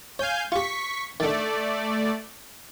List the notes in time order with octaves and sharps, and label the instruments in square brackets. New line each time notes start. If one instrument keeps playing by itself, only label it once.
[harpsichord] C#5 [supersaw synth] F5 G#5 G6
[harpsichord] F4 G4 [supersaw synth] C#6 B6
[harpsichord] D3 D#3 [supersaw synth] A3 D5